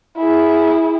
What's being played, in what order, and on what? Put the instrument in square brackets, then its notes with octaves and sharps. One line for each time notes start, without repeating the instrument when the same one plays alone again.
[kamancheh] E4 G#4